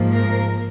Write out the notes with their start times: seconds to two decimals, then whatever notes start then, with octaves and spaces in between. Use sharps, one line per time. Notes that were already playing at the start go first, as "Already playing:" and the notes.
Already playing: G#2 F3 A#3
0.14 A#4